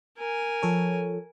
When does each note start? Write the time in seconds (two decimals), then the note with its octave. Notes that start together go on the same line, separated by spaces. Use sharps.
0.18 A#4 G#5
0.62 F3 A4 C#5